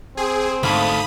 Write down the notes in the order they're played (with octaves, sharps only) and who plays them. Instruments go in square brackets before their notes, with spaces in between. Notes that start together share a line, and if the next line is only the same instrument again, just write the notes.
[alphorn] C4 [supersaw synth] G#4
[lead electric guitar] D2 A4 [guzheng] G#2 A#3 [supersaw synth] B5 D#6